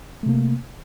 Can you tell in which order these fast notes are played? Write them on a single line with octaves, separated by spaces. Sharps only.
A3 C3 A#3